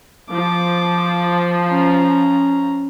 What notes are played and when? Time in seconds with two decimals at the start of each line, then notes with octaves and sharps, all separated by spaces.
0.31 F3 D6
1.69 C#4 A#5